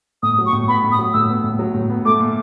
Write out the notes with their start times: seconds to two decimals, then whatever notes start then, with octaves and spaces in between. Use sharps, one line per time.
0.23 A2 D#6
0.38 F#3
0.46 C#6
0.53 A2
0.68 B3 B5
0.84 A2
0.92 D#6
0.99 F#3
1.13 A2 E6
1.29 B3
1.44 A2
1.59 F#3
1.74 A2
1.90 B3
2.05 A3 D6
2.20 A#2